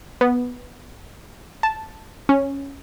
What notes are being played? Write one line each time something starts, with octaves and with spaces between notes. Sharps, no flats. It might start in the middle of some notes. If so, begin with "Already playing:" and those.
B3
A5
C#4